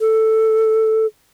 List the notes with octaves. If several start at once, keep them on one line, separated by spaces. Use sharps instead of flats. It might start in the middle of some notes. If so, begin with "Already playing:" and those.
A4